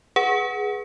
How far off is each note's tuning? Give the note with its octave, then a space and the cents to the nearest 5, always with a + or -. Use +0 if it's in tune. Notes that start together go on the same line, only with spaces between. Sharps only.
G#4 +0 B4 -15 F#5 +0